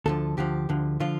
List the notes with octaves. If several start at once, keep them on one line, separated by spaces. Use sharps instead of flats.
D2 D3 F3 A4
D2 D3 F3 G4
D2 D3 F3
D3 F3 F4